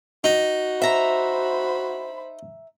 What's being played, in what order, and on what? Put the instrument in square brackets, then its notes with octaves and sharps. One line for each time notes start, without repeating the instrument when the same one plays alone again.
[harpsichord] D#4 [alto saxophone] F#4
[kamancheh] C5 B5 [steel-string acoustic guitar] E5 A#5